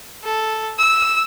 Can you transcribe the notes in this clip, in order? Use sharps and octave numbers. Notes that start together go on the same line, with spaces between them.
A4
E6